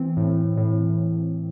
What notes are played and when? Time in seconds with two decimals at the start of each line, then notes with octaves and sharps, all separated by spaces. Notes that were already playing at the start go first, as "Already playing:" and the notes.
Already playing: E3 C4
0.17 A2
0.57 A2